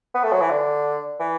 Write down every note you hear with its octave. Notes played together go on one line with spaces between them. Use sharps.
B3
A3
F#3
E3
D3
E3